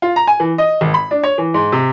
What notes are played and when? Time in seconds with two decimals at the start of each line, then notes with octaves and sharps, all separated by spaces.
0.02 F4
0.16 A#5
0.27 G#5
0.40 E3
0.58 D#5
0.81 G#1
0.94 B5
1.11 D4
1.23 C#5
1.38 E3
1.54 G#2
1.72 C3